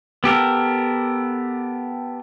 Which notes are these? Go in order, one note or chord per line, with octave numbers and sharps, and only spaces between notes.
B3 G4 A4 A#4